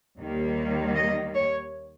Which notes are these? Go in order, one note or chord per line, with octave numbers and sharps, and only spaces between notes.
D#2 D#3 G3 A#3
D#5
C#5